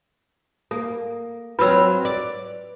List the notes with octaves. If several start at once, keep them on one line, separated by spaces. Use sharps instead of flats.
A#3 A4
F#3 C4 F4 B4 B5 E6
D5